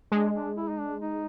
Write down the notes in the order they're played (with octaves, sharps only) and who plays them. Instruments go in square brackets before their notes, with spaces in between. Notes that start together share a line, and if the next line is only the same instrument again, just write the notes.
[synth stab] G#3 [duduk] D4
[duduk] D4
E4
D#4
D4
D#4